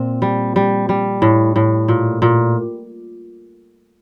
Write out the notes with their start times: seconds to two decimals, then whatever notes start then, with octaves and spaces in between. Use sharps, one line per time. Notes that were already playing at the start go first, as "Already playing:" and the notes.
Already playing: A#2 C4
0.22 G3
0.56 G3
0.89 G3
1.22 A2
1.56 A2
1.88 A#2
2.22 A#2